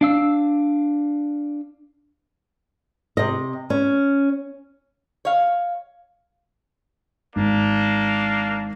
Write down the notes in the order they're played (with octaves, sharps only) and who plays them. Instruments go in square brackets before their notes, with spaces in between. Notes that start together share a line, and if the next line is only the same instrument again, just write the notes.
[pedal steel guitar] D4 F5 E6
[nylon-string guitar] C3 D#5
C#4
[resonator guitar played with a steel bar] C#5 F5
[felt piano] G#1 [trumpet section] A#3 D4